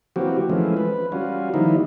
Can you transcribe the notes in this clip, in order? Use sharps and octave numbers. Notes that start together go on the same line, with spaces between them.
E3 F#3 A#3 C4 F#4 G4
E3 F3 G#3 A3 C#4
B4
G3 C#4 F4 F#4
D#3 F3 G3 A#3 D#4 E4